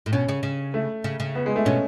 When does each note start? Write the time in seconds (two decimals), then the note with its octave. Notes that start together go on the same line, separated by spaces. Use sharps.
0.06 A2
0.12 B2 C#4
0.29 C#3
0.43 C#3
0.74 A3
1.04 C#3
1.20 C#3
1.35 B3
1.46 G#3
1.56 A3
1.65 B2 C#4